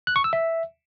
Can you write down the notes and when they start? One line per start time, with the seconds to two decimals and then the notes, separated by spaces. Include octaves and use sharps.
0.07 F#6
0.16 C#6
0.24 E6
0.33 E5